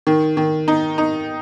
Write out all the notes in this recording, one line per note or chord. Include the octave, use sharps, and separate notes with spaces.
D#3
D#3
D#4
D#4